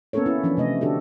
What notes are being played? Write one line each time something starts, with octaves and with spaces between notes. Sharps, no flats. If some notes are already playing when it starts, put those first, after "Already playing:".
A#3 B3 C#4 A4 A#4 C#5
C#4 E4
E3 F3 C#4 D4
C3 A3 D#5
D3 D4 F#4 G4 A4